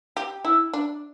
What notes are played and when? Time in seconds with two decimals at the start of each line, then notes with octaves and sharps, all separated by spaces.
0.17 G4
0.45 E4
0.73 D4